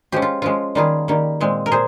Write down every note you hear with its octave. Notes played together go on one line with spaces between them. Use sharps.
F3 G#3 C#4 G4
F4
F3 G#3 C#4 F4
D#3 G3 A#3 F4 G#4
D#3 G3 A#3
A#2 G#3 C4
A#4
A#2 G#4 C5